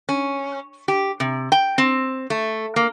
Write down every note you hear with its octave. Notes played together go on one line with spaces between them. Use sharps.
C#4
G4
C3
G5
C4
A3
A#3